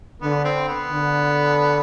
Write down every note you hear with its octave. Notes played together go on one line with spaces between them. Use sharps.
D3 B3
C4
B3
D3